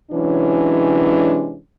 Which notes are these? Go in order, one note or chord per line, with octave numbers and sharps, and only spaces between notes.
C3 E3 F#3 G#3 C#4 D4